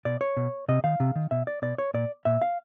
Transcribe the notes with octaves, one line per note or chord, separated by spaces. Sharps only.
B2 D5
C#5
B2
C3 D#5
D#3 F5
C3
D#3
B2 E5
D5
B2 D5
C#5
A#2 D5
A#2 E5
F5